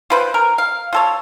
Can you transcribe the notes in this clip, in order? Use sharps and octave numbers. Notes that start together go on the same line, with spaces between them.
F4 B4 C5
A#4
F5
F4 A4 C#5